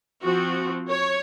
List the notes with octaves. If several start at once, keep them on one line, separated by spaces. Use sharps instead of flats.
F3 C4 F#4
C#5